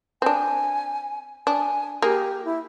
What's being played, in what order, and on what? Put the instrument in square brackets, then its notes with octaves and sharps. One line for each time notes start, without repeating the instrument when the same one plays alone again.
[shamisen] C4 D4 [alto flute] G#5
[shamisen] D4 [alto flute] G#5
[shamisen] A#3 G#4 [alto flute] G4
[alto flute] E4